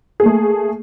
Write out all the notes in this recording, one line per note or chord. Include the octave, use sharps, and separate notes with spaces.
A3 A#3 G#4